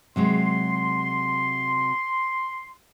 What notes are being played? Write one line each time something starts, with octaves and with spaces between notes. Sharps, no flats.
C3 F#3 G#3 C6